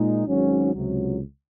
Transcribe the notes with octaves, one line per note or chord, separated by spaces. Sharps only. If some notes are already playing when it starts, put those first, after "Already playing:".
Already playing: A#2 G#3 D#4
G#1 G#2 F#3 C#4
C#2 C3 F#3